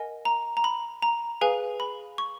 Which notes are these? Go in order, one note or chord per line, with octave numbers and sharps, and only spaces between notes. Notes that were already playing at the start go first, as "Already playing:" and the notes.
Already playing: A#4 D#5 F#5 G#5
A#5
A#5
B5
A#5
G#4 B4 F5 G#5
B5
C#6